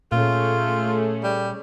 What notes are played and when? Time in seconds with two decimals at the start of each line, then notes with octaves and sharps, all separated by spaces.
0.12 A#2 A3 C#4 F4 G#4
1.23 G3